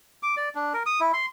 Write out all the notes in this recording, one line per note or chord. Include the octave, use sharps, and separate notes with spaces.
D6
D5
D4
A#4
D#6
E4
C6